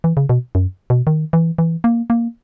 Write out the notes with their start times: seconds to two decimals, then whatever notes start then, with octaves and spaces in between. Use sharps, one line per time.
0.04 E3
0.17 C#3
0.29 B2
0.55 F#2
0.90 B2
1.07 D#3
1.33 E3
1.58 E3
1.84 A#3
2.10 A#3